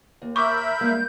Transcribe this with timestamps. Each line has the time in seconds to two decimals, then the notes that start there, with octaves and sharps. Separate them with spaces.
0.22 D#2
0.36 A#4 E5 B5 C#6 D6 G6
0.81 G2 G#3 A#3